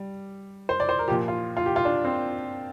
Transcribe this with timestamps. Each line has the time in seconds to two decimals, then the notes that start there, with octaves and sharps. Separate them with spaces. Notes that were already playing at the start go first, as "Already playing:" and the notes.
Already playing: G3
0.69 C5
0.80 D5
0.89 C5
0.99 A#4
1.08 A#2 F3 G4
1.28 F4
1.57 F4
1.66 G4
1.76 F4
1.85 D4
2.05 C4